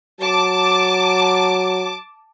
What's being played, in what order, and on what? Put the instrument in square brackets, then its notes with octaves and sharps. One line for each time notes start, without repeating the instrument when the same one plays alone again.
[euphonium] F#3 [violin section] A5 D6